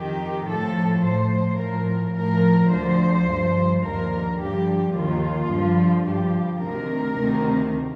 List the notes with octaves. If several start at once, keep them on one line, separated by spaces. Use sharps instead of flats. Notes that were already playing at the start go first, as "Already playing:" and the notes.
Already playing: F2 D#3 G4
A2 F3 A4
A2 F3 C5
A2 F3 A#4
A2 F3 A#4
D2 D3 F3 C5
G2 F3
D#2 D3 F3 A#4
G2 D3 F3 G4
D#2 D#3 F4
G2 D3 F3
G2 F3 G4
D2 C3 D#3 A#4
D2 C3 D#3